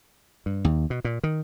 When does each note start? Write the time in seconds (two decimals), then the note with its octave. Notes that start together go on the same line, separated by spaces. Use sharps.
0.46 G2
0.65 D#2
0.90 B2
1.04 A#2
1.23 D#3